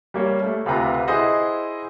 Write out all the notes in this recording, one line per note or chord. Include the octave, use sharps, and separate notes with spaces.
G3 A#3 C#5
A3
D2 C3 F4 B4 A#5 D6
E4 G#4 C5 D#5 F#5